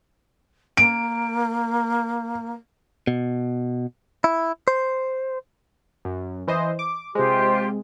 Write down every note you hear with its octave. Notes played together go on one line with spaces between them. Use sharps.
A#3 D7
B2
E4
C5
F#2
E3 C5 D#5
D6
C3 G#3 F4 G4 C5